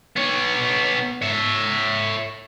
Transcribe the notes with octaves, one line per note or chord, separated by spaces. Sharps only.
B3 C#5
C#5 E5